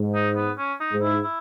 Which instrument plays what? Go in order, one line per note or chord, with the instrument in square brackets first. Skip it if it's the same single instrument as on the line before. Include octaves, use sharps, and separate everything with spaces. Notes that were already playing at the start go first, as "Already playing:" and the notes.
Already playing: [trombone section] G#2
[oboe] D#4
B3
C#4
D#4
[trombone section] G#2
[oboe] E4
E4